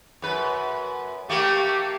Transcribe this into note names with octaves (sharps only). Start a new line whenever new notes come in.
F#2 B4
A3 A#3 G4